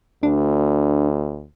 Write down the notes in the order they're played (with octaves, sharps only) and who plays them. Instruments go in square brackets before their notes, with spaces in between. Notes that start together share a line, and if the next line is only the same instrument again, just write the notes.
[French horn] D2 [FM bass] D4